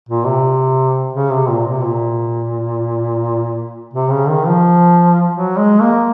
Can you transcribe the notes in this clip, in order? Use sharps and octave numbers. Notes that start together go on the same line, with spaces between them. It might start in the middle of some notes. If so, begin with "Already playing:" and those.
A#2
C3
C#3
C3
A#2
C3
A#2
C3
C#3
D#3
F3
F#3
G#3
A#3